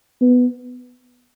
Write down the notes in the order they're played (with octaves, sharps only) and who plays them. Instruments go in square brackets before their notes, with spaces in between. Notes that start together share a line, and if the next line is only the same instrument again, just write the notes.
[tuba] B3